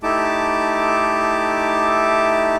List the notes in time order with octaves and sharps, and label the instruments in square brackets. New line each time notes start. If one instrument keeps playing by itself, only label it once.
[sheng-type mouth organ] A3 D#4 E4 G4 A5 D6